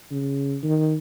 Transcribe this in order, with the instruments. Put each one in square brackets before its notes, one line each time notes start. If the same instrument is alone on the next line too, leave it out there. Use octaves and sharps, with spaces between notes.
[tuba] C#3
D#3